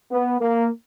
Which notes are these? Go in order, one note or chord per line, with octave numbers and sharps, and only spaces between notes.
B3
A#3